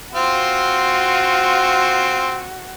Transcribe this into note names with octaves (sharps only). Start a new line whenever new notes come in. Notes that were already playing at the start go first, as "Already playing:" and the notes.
C4 F4 F#4